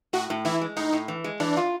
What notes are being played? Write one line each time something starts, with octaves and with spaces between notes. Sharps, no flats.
A2 F#4
A2
E3 E4
G#3
A2 D#4
A2
E3
G#3
E3 D4
F4